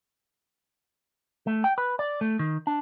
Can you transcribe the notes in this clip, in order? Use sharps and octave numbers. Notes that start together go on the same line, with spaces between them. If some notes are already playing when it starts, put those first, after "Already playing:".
A3
G5
B4
D5
A3
D#3
D4